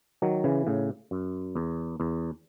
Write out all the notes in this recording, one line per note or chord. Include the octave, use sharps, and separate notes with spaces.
D#3 F#3
C#3 E3
A2 C#3
F#2
E2
E2